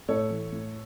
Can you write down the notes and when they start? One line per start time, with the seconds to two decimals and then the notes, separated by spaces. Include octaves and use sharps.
0.08 A2 A4 C#5
0.30 E3
0.52 A2